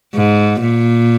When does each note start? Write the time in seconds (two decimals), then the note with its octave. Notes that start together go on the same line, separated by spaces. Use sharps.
0.15 G#2
0.61 A#2